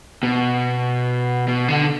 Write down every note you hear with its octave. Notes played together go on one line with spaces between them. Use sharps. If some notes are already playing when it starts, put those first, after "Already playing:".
B2
B2
D3